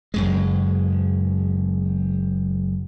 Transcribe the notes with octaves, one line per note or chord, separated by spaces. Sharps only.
F#1 F#2 G#3